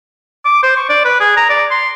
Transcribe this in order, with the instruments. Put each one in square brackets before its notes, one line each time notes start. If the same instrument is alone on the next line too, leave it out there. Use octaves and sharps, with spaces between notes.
[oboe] D6
C5
C#6
D5
B4
G#4
A#5
D5
C6